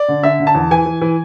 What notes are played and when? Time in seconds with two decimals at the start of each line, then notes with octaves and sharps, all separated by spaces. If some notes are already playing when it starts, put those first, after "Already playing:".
Already playing: D5
0.08 D3
0.23 D3 E5
0.40 D3
0.47 A5
0.55 E2
0.71 E3 G#5
0.86 E3
1.01 E3